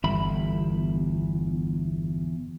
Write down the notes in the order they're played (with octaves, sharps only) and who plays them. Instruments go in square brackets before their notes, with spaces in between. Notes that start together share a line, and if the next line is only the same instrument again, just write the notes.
[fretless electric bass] G1 [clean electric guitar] E2 E5 B5